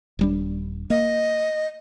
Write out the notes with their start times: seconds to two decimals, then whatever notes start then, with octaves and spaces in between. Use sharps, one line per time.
0.19 D#1 G3 D4
0.90 A#3 D#5